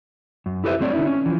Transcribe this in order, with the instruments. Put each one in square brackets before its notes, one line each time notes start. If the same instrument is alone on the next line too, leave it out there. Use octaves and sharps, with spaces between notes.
[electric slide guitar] F#2
E4 G4 A4 B4 C5 E5
F#3 A3 C4 C#5 D5
D3 C#4 D#4 E4
C#4
E3 F3